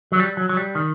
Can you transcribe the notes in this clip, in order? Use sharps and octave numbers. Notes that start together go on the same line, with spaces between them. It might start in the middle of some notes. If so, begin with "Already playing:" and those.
F#3
G3
F#3
F#3
G3
D#3